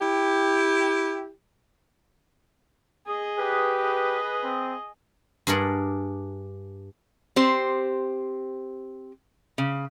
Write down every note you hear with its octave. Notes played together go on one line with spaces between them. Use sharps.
E4 G4
G#4 D#5
G4 B4
G#4 D#5
C4
G2 D4 G#4 A#4 F#5
C4 G4 C5
C#3